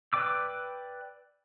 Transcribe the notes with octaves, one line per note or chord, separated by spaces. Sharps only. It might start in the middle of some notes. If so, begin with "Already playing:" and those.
B4 D5 G5 D6 E6